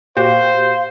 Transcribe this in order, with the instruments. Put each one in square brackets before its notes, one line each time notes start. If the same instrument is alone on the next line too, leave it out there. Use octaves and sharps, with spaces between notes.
[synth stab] A#2 F#4 G4 [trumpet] C5 [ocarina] F5